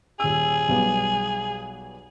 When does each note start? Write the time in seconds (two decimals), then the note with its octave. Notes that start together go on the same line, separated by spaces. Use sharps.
0.20 D#1 G#4 E6
0.69 B1 G3 B3